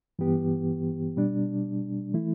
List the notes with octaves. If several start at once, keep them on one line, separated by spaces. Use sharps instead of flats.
G2 E3 B3 G4
B2 G3 D4
E3 A3 E4